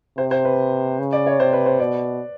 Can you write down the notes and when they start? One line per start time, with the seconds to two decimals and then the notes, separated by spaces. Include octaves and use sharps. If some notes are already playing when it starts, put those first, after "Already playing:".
0.18 C3 C5
0.31 C5
0.45 B4
0.99 C#3
1.13 D5
1.26 C#5
1.39 C3 C5
1.53 B4
1.66 C5
1.80 B2 D5